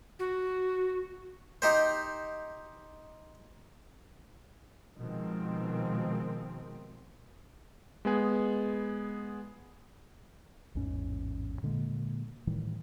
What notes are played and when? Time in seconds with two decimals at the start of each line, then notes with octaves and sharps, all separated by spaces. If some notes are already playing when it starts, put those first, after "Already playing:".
0.19 F#4
1.62 D#4 G4 C5
4.97 B2 D#3 F3 G#3 C4
8.05 G#3 B3 G#4
10.75 A1 E2 G#2 C#4
11.63 A#2 D3 G#3 A#3
12.47 A2 D#3 E3 G3